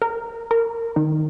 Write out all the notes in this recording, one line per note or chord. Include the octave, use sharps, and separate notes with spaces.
A#4
A#4
D#3